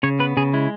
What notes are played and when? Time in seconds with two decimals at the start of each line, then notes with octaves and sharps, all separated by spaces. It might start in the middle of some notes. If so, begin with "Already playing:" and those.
0.03 C#3 C#5
0.19 B3 B4
0.37 C#3 G#4
0.54 G#3 E4